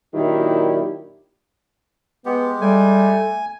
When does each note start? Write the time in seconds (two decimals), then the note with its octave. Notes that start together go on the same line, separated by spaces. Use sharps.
0.14 A#2 D#3 F#3 D4 E4 G4
2.26 G#3 B3 G4
2.61 G3 A3 G#5